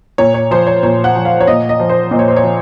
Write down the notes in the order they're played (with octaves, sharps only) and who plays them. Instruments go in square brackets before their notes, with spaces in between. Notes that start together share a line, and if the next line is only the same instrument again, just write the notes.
[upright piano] A#2 C#5
C#5
F3 C5
C#5
A#2 C#5
F#5
F3
F5
C#5
A#2 D#5
D#5
F3
C5
A#2 D#5
C#5
C5
C#5
F3